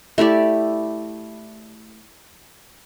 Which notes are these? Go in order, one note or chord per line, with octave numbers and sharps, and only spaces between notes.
A3 E4 G4 D5